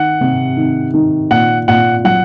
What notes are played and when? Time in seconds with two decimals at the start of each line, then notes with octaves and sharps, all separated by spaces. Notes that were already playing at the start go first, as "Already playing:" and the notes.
Already playing: D#3 F#5
0.21 C3
0.57 D#3
0.94 D#3
1.30 A#2 F#5
1.68 A#2 F#5
2.04 F#3 F#5